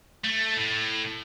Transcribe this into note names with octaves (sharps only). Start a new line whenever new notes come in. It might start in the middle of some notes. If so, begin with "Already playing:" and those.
A3
A2